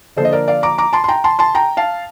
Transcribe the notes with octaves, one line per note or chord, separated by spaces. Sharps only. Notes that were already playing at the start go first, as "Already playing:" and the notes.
D3 F3 A#3 D4 A4 C5
D#5
A#4 D5
D5 F5
A#5 D6
A#5 D6
A5 C6
C6
G5 A#5
A5 C6
A5 C6
G5 A#5
F5 A5